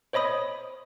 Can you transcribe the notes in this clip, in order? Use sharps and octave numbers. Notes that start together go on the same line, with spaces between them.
C5 C#5 D#5 B5 D#6